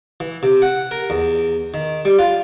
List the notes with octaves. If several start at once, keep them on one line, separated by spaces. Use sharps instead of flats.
E3
C3
F#5
A#4
E2
D#3
G3
F4